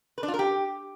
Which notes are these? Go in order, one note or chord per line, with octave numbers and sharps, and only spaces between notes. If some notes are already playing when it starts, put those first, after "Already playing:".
B4
D4
F4
A#4
G4